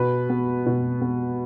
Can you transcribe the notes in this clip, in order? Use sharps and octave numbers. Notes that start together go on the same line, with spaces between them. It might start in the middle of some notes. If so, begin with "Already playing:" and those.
Already playing: B2 B4
B3
B2
B3